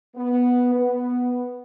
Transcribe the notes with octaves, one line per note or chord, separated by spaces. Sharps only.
B3
B3